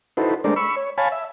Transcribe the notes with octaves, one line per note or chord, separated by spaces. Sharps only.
D#4 E4 F#4 A4 B4 C5
G#3 A3 D4 A#4 C5 D5
B5 C#6 E6
C#5
C#5 F5 G#5 A5 B5
E5